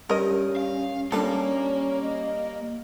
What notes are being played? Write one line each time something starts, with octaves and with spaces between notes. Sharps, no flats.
G2 C#4 A#4 D#5
F5
G3 A#3 C#4 D4 F4 A4
D#5